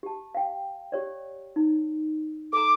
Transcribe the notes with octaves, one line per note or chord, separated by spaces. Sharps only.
G4 A5
F5 G5
G4 C#5 D5
D#4
A4 A#5 D6